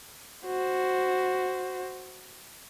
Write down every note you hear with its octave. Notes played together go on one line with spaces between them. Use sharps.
F#4 C5